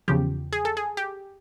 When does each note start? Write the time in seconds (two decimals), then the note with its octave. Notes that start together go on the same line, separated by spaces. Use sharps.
0.08 E2 C#3 F3 G4
0.53 G#4
0.65 A4
0.77 G#4
0.97 G4